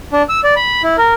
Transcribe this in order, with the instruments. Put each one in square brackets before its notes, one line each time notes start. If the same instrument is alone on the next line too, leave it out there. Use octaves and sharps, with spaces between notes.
[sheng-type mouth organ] D4
E6
D5
B5
E4
A#4